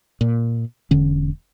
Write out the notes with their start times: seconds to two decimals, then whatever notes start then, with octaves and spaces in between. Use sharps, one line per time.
0.21 A#2
0.91 E1 D3 C#4